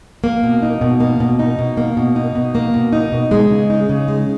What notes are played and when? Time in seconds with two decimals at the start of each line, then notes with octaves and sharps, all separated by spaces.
0.24 A#3
0.43 B2
0.63 D#4
0.81 B2
1.00 A#3
1.20 B2
1.39 D#4
1.59 B2
1.77 A#3
1.97 B2
2.16 D#4
2.35 B2
2.55 A#3
2.74 B2
2.93 D#4
3.12 B2
3.31 G#3
3.50 C#3
3.70 D#4
3.89 C#3
4.08 G#3